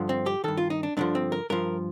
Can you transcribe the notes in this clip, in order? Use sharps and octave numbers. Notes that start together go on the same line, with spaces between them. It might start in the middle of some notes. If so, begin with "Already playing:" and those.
Already playing: G2 D3 F3
C4
G4
G2 D#3 A4
F4
D#4
D4
G2 D3 F3 D4
C4
A#4
G2 F3 A#4